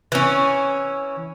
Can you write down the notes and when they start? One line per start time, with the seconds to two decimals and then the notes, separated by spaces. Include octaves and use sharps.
0.12 E3 C#4